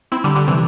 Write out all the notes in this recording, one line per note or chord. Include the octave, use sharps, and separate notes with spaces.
C4 E4
D3 G3
D3 G3
C3 E3